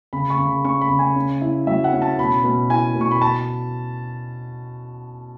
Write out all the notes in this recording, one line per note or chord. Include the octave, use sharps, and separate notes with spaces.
C#3 B5
C#6
C#3
B5
C#4 C#6
B5
C#3
G#5
C#4
E4
F#3 E5
F#5
C#4
A5
B2 B5
B2
E4 G#5
B2
C#6
B5
A5